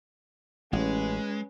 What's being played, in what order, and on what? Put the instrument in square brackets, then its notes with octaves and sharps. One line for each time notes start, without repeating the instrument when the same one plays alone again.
[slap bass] A1 [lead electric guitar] G#3 [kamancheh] C#4 B4